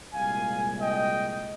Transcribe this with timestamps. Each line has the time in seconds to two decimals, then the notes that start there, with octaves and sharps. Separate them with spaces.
0.13 C2 A#2 G#3 F5 G#5
0.81 D#5 G5